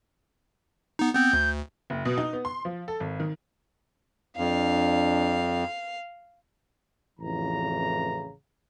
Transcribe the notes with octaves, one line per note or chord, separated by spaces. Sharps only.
B3 D#4
B3 C4 G6
D2
F#1
B2
D#4
B3
C6
F3
A4
G#1
D#3
F2 D4 F5
A1 F2 C#3 E3 A#5